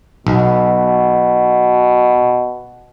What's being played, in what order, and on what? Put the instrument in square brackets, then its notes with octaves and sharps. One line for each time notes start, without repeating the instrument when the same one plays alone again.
[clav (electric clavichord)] B1 [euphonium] B2